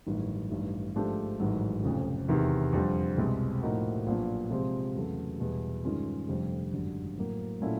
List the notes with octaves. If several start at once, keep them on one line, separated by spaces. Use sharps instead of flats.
A1 G2 D#3 F#3
A1 G2 D#3
G#2 F3 A3 D4 G4
A1 G#2 D#3 F#3
F1 F2 C#3
E2 C3 D#3
F2 D3 G3 C4
C2 B2 G#3 C4
A2 F3 A#3 D#4 F#4
A#1 A#2 F#3 B3 D4
C3 F3 G#3 C4
E2 C#3 F#3 A3
E2 B2 G3
G2 D#3 G#3 C#4 F4
F1 F2 D3 G3
G#1 F#2 D3 G3
A2 F#3 A#3
A#2 F#3 A3 C#4 E4